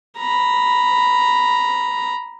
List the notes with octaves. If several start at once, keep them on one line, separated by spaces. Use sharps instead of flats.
A#5 B5